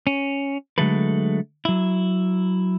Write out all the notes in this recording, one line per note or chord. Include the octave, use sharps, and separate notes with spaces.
C#4
D3 F#3 G#3 A3 A4 B4
F#3 E4